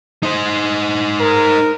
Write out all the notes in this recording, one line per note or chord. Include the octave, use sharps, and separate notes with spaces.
D#4 C5
A#4